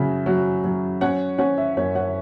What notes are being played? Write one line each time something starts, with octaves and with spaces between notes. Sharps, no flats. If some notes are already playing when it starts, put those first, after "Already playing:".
Already playing: C#3 F#3 E5
F#3
F#3
C#4 C#5 F#5
C#4 C#5 F#5
E5
F#2 C#5
C#5 F#5